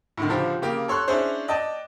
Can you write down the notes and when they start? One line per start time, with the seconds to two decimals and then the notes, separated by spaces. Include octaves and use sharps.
0.18 A2 D3 D#3
0.29 C#2 D3 F3 G4
0.62 C#3 A#3 G4
0.88 A4 C#5 C6 C#6 F#6
1.08 C#4 D4 E4 G#4 C5 C#5
1.48 D5 D#5 G5 A5